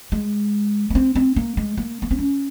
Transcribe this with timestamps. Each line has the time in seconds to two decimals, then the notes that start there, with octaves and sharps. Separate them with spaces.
0.12 G#3
0.90 A#3
0.95 C4
1.15 C4
1.36 A#3
1.57 G#3
1.77 A#3
2.02 A#3
2.11 C4
2.19 C#4